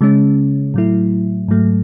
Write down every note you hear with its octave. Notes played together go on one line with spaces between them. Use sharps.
C#3 G#3 C#4
A2 F#3 A3 E4
G#2 F#3 A3